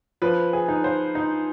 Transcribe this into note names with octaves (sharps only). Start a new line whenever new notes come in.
F3 B4
G#4
D#4
C5
D#4